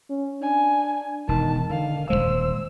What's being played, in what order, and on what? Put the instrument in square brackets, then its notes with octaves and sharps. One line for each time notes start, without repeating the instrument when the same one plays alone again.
[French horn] C#4
[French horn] D4 [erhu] G#5
[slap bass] E1 [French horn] D#3 [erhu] A5
[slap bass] D3 [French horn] D#3 [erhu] F5
[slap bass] D#1 D#2 G#3 [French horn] C5 [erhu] E6